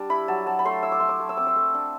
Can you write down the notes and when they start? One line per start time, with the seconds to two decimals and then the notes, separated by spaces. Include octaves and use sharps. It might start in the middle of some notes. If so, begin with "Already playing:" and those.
Already playing: G3 D4
0.10 E4 B5
0.28 F#3 A5
0.46 F#3 A5
0.59 B5
0.65 A3 C6
0.83 E4 E6
0.92 D6
1.00 A3 C6
1.09 D6
1.20 A3
1.29 E6
1.37 C4 D6
1.47 E6
1.56 A3
1.74 D4